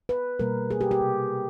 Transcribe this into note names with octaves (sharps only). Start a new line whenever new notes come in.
B4
B2 G3 A#3 A#4
G#4
G4
G4
C3